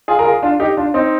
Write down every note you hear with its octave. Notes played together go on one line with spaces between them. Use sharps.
F4 G#4
A#4
F4 G#4
D4 F4
D#4 G4
D4 F4
C4 D#4